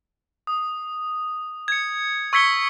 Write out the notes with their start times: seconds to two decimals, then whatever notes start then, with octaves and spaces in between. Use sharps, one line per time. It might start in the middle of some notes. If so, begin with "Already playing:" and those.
0.47 D#6
1.68 G#6 C#7
2.33 C#6 E6 G#6 B6 C#7 G7